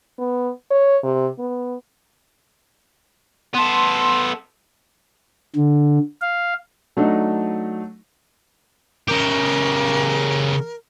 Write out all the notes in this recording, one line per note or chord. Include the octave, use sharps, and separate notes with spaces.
B3
C#5
C3
B3
B3 A4 C6
D3
F5
F#3 A3 D4 D#4
C#3 G4 A#4